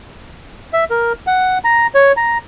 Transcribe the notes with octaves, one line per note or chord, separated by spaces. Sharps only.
E5
A#4
F#5
A#5
C#5
A#5